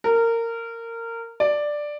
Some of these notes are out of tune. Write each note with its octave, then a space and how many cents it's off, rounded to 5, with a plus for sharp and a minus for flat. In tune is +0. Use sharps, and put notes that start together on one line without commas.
A#4 -20
D5 +5